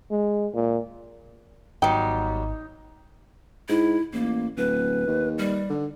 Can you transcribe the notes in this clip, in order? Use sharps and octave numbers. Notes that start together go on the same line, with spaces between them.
G#3
A#2
G#1 F#3 G3 B3 D#4 G5
G#2 E4
A1 A#3
D1 B4
D#2
G3
D3